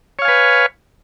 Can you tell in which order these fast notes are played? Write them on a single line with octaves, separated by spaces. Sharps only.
C#5 F5 G#5 B4